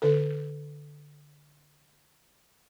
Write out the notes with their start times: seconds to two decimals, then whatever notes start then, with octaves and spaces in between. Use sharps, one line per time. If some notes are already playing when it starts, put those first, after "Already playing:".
0.02 D3 A4